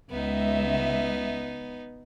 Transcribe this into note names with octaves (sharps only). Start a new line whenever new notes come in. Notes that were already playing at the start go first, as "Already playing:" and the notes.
C#2 B3 D#4 E5